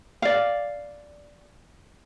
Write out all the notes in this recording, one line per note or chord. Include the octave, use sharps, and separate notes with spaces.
D5 F5